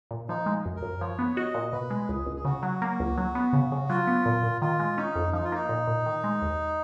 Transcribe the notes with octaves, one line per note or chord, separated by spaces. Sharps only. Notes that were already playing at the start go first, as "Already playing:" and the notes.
A#2
F3 D#4
G#3
F#2
A#4
F#2
F3 C#5
B3
F#4 D#5
A#2
B2 B4
G#3
C#2 G#4
C#2
G#4
C#3 F#4
F#3
A#3
C#2
F#3
B3
C#3
C#3
F#3 F4
B3
A#2
A#2
D#3 F4
G#3
C#4 D#4
F2
F3 D#4
F4
A#3 D#4
A#2
A#2
D#3
G#3
D#2